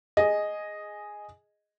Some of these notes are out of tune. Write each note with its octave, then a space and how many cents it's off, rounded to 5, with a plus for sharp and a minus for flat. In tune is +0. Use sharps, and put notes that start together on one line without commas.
G#4 +0 D#5 +0